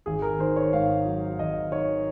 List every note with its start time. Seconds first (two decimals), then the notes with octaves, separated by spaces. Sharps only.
0.06 G#1 G#4
0.22 A#4
0.39 D#3 C5
0.56 C#5
0.73 G#2 F5
1.05 F#3
1.39 G#1 D#5
1.72 D#3 C#5